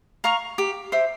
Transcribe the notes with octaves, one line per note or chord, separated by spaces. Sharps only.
F5 A#5 C#6
G4
C5 E5